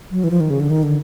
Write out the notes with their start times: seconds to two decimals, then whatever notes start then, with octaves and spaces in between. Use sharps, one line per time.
0.11 F#3
0.24 E3
0.30 F3
0.40 D#3
0.50 C#3
0.60 D3
0.70 D#3
0.83 D3